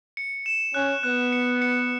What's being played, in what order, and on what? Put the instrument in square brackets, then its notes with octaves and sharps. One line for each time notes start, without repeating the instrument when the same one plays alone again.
[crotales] C#7
E7
[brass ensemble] C#4 [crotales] F#6
[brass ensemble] B3 [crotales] F#6
[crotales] C#7
C#7